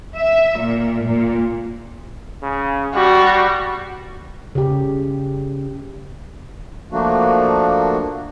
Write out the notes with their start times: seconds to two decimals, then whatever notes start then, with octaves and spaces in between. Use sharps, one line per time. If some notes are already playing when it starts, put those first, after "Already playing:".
0.18 E5
0.61 A#2
1.06 A#2
2.42 C#3
2.95 G3 F#4
4.55 C#3 G4
6.92 F3 A3 A#3 D4 F#4